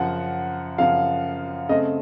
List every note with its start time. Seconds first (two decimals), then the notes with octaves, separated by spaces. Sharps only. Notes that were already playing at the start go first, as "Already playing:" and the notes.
Already playing: F#2 C#3 F3 F#5
0.78 F#2 C#3 F3 F5
1.69 C#3 A3 C4 D#5